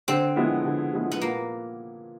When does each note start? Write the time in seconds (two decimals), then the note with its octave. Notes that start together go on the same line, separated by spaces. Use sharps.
0.08 D3 C4
0.36 F3 G#3 B3 E4
0.65 D3
0.94 F3 G#3 B3 E4
1.12 B3
1.21 A#2 A#3